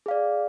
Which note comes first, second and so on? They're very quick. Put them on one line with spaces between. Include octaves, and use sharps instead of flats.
G#4 F5 D5